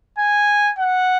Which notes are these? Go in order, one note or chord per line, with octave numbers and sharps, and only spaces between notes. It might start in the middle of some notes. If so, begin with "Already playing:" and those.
G#5
F#5